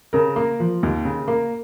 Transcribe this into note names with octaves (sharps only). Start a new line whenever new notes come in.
C#3 A#4
A#3
F3
D#2
C#3
A#3